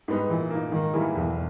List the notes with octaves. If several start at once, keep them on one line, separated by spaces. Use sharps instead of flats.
G#2 G3 B3 D#4
A#2 E3
A#3 D#4
G#2 D#3
E3 G3 A#3 E4
B1 E2